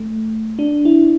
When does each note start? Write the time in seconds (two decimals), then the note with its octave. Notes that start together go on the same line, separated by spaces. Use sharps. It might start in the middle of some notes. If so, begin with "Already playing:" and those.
Already playing: A3
0.59 D4
0.85 E4